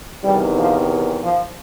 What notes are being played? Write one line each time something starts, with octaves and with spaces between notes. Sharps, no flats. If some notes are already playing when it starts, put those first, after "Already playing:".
E2 C3 D#3 G3
F3
F3